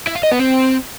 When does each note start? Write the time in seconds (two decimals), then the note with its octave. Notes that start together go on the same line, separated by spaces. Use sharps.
0.07 E4
0.15 F5
0.23 D#5
0.31 B3
0.39 C4